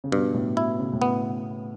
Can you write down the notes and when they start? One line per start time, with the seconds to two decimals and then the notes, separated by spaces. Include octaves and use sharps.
0.04 C#3
0.12 G2 B2
0.34 A2
0.57 B2 E4
0.79 C#3
0.93 A2
1.02 B2 B3